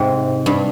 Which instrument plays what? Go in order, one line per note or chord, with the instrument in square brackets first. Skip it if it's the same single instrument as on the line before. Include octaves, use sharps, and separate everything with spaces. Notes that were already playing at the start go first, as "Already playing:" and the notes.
Already playing: [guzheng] G#2 C3
G2